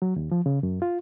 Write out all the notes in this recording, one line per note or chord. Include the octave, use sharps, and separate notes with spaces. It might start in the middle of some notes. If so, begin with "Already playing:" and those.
F#3
D#2
F3
C#3
F#2
F4